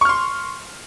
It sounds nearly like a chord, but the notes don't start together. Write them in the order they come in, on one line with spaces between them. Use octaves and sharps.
C#6 F6 C6